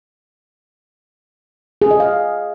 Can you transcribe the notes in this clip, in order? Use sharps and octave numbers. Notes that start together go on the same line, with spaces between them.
G#4
D#5
F5